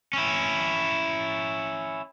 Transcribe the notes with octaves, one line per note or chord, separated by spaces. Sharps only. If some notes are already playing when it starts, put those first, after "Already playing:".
C#4 E4